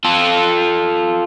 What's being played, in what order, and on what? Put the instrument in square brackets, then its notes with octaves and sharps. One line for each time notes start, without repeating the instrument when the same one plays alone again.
[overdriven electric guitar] F4 A4